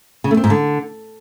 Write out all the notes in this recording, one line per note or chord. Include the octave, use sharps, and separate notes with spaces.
C#3
A3
C4
G#2
D3